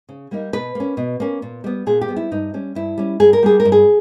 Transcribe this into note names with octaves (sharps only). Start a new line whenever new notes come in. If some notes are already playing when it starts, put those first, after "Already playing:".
C#3
G3 A#3 D#4
B2 B4
A#3 C#4
B2
A#3 C#4
A#2
G3 B3
A#2 G#4
G4
G3 B3
E4
G2 D#4
G3 C#4
G2 E4
G3 C#4
G2 G#4
A#4
G3 A#3 G#4
A#4
G2
G#4